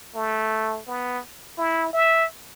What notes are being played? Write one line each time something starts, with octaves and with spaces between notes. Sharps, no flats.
A3
B3
E4
E5